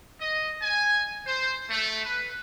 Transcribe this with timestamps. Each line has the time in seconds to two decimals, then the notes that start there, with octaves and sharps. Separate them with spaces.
0.21 D#5
0.61 G#5
1.25 C5
1.71 A3
2.04 B4